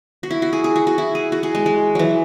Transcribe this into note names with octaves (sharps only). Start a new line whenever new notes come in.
F#4
E4
F#4
G#4
G#4
F#4
F#4
E4
G#4
F#4
G#4
G#3
G#3
E3 F#3